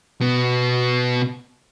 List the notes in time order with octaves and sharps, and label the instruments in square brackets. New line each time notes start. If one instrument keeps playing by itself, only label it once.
[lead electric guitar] B2 B3